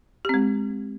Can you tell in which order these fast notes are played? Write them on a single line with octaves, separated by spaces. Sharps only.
G4 C4 G#3